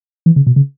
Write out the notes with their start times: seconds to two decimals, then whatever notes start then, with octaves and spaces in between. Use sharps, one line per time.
0.26 E3
0.36 C#3
0.47 B2
0.56 C#3